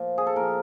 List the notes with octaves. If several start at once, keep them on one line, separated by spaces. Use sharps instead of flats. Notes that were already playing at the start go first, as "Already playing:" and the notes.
Already playing: A#2 F3
G#4
A4
A#2 F3 A#4